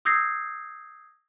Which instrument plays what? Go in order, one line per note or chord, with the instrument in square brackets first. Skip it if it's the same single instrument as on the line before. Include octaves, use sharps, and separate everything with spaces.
[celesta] D#6 E6 G6 G#6 A#6 C7